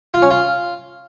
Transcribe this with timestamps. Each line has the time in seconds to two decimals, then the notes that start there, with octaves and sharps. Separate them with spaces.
0.14 F4
0.22 C#4
0.30 F4